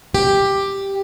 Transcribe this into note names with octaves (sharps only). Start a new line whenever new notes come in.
G4